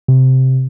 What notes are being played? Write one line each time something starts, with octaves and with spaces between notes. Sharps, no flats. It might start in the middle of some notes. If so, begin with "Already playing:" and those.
C3